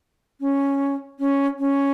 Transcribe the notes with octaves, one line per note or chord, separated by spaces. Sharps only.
C#4
C#4
C#4